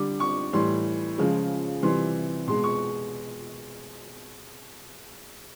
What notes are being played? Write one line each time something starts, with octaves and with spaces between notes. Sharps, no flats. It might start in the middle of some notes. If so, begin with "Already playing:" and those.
Already playing: D3 G3 D6
C#6
A2 E3 G3 C6
C#3 F3 G#3
C3 E3 G3 C6
B2 G#3 C6
C#6